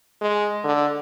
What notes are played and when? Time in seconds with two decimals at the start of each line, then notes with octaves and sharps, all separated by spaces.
0.21 G#3
0.64 D3